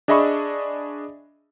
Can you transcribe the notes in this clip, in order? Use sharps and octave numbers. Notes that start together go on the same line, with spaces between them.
D4 G#4 D#5 E5 B5 C#6